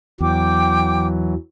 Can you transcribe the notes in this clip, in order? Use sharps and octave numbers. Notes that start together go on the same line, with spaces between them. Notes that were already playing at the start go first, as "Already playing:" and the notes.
E2 E3 F#3 G5 D6